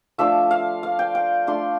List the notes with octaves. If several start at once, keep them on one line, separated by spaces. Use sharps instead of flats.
F3 A3 D4 F4 E5
F5
F5
G5
G5
A3 D4 F4 C6